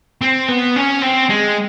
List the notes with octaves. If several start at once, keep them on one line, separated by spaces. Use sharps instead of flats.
C4
B3
C#4
C4
G#3